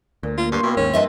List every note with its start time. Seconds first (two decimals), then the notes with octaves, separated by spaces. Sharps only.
0.23 D2 A#2
0.38 F4 A#4 F5
0.52 G2 C5 C6 C#6
0.63 B2 A#3 C4 E4
0.77 D#2 G#2 C#4
0.94 G2 C4 B4 D#5 E5 A5